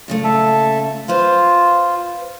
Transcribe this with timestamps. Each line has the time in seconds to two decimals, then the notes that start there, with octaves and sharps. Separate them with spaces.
0.08 A#2 C#3 A3
0.24 A4 E5 A5
1.08 F4 B4 C5 F5